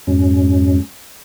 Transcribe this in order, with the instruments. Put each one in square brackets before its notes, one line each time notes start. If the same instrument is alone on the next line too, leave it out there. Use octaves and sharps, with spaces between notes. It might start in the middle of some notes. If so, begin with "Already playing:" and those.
[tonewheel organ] F2 G#2 F#3 G#3 C#4